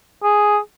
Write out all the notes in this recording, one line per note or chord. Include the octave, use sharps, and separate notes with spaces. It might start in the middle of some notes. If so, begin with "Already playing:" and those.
G#4